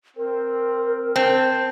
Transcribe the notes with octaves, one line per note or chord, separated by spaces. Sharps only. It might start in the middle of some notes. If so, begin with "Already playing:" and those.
C4 A#4
C4 C5 A5